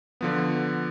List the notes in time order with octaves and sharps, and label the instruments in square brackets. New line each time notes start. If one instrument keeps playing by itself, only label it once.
[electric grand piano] D3 F3 B3